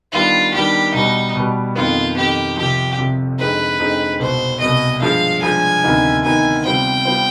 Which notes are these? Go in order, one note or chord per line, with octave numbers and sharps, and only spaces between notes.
D#3 G3 B3 D4 F4
D#3 G3 B3 D4 G4
B2 G3 B3 D#4
B2 G3 B3
F2 D#3 B3 F4
F2 D#3 B3 G4
C2 C3 F3 G4
C2 C3 F3
F2 D3 G#3 C4 D#4 B4
F2 D3 G#3 C4 D#4
C2 B2 B3 C5
C2 B2 B3 D#5
G2 F3 G#3 F5
G2 F3 G#3 G#5
D2 C3 D#3 B3 D#4
D2 C3 D#3 B3 D#4 G#5
C3 G3 B3 F4 C5 G5
C3 G3 B3 F4 C5